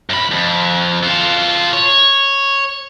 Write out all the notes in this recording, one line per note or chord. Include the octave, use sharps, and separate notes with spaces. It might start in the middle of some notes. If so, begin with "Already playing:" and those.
F#2 B5
F2
F4 A4
C#5